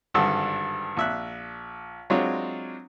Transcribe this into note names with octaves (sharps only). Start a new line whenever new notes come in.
G#1 G2 D3 A4 E6
A#1 E5 F#6
F#3 G#3 C4 D4 F4 C#5